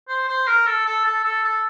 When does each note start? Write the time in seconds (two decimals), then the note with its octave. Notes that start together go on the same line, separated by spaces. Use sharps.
0.08 C5
0.28 C5
0.48 A#4
0.66 A4
0.86 A4
1.05 A4
1.24 A4
1.43 A4